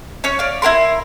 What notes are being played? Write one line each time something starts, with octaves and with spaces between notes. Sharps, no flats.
C#4 C#5
D5 F5
E4 G4 A#4 C6